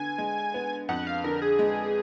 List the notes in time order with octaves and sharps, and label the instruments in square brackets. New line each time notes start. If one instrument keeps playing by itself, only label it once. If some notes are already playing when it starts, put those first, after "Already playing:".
Already playing: [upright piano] D3 B3 [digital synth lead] G#5
[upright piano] G#3
B3
[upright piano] F2 [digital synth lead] F#5
[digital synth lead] F5
[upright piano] D3 [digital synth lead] A#4
[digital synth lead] G#4
[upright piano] G#3